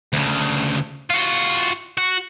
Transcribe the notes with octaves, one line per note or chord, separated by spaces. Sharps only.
D2 C#3
F4 F#4
F#4